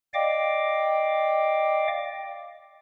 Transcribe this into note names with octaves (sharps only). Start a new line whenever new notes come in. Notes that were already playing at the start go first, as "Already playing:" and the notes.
D5 D#5 F5 G5 D6